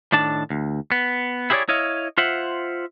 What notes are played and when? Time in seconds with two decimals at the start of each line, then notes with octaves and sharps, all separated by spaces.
0.12 A2 D#3 D4 A5
0.50 D2
0.92 B3
1.50 E4 G4 G#4 A#4 C#5 D5
1.69 E4 C#5 D#5 F5
2.18 F4 C5 E5 F#5